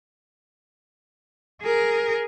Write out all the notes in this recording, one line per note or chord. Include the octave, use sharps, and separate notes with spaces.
G#4 A#4